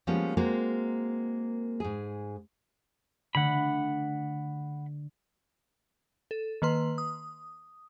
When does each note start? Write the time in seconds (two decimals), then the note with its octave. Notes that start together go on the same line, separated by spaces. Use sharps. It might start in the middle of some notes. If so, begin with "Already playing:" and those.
0.07 F3 G3 G#3 A#3 B3 C#4
0.37 G#3 A#3 C4 F#4 A#4
1.80 G#2 G#4
3.35 D3 A3 F#5 B5
6.31 A4
6.62 D#3 A#3 B4 C6
6.98 D#6